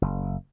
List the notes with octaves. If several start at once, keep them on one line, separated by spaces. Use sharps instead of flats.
F#1